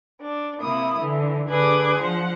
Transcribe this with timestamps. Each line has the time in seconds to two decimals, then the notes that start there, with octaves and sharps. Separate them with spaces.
0.21 D4
0.60 C3 A#3 E4 D#6
0.98 D3 E3
1.48 D3 D4 G#4 B4 D6 G#6
1.99 F3 C5 F#5